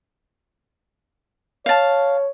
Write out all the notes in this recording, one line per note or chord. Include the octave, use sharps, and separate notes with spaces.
C#5 F5 A5